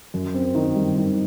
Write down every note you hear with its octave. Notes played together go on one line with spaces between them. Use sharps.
F#2
C4
D#3
G3
D#3